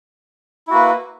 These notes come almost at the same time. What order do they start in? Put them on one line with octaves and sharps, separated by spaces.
E4 F#4 A#3 B4